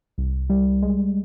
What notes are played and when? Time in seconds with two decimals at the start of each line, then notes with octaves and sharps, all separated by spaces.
0.18 C2
0.50 G3
0.82 G#3